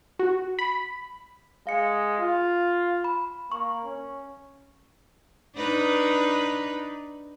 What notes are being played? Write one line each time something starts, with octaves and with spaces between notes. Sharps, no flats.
F#4
B5
G#3 F5 C#7
F4
B5
A#3 C#6
C#4
D4 D#4 B4